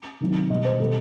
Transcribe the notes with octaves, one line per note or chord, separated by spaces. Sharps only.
C3 D#3 F#3
B2 G3 D#5
C5
B2 G3 A4